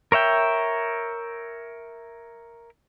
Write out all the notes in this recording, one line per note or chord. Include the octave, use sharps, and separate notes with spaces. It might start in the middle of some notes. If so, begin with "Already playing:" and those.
A#4 C#5 E5 G5